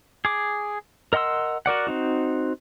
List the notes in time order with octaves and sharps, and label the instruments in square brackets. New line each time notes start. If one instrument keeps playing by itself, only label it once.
[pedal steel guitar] G#4 D6
A#4 D#5 F#5 C6 E6
F#4 A#4 D5 F#5
C4 D#4 F#4